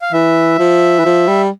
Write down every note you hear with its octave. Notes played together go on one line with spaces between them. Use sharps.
F5
E3 E5
F3
E3
F3
G3